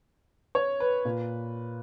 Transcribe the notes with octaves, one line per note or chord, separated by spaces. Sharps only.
C#5
B4
A#2